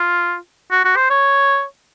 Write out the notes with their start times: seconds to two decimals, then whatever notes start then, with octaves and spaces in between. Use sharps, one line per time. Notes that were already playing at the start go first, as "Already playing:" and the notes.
Already playing: F4
0.71 F#4
0.85 F#4
0.96 C5
1.10 C#5